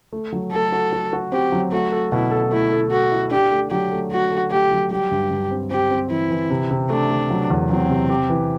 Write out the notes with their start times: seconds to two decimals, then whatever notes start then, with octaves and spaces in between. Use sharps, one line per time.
0.13 A3
0.33 F#3
0.53 A3 A4
0.72 F#4
0.93 F#4
1.13 F#4
1.32 C4 G4
1.52 F#3
1.72 A3 F#4
1.92 A4
2.12 B2 E4
2.31 A4
2.52 A3 E4
2.72 A4
2.91 F#4 A4
3.11 E4
3.31 D4 G4
3.52 A3
3.71 F#3 G4
3.92 A3
4.11 A3 F#4
4.31 A3
4.51 A3 G4
4.71 F#3
4.91 G3 G4
5.11 G2
5.31 G2
5.51 C4
5.71 C4 G4
5.91 C4
6.10 E3 E4
6.30 E3
6.50 C3
6.71 C3
6.90 A3 D4
7.10 A3
7.30 F#3
7.50 E2
7.70 F#3 C4
7.90 C3
8.10 G4
8.30 E3